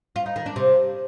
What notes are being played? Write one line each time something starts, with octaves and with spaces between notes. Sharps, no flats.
F4
D#4
D#3
D4
C3